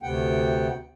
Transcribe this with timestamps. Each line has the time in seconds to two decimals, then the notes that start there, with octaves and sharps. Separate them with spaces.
0.03 D2 C3 B3 F#5 G5